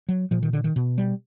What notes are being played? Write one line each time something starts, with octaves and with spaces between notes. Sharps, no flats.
F#3
A#2 F3
D#3
D3
D#3
B2
G3